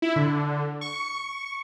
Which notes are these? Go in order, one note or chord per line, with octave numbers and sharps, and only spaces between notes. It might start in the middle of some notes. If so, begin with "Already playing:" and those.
E4
D3
C#6